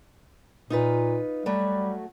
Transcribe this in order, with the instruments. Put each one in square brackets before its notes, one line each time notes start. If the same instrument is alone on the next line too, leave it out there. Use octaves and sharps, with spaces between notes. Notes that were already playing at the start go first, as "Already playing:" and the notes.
[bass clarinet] A#2 [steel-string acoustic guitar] D#4 F4 B4
[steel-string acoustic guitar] F#3 A3 F#4 [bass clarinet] G3